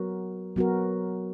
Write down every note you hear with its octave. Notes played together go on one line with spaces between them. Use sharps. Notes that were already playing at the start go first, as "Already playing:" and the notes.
Already playing: F#3 B3 F#4 A#4
F#3 B3 F#4 A#4